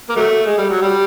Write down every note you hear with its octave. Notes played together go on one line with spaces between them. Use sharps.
A#3
F#3 A3
G#3
G3
F#3
G3